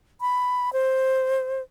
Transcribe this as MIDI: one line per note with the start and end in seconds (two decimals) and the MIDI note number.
0.21 0.73 83
0.73 1.62 72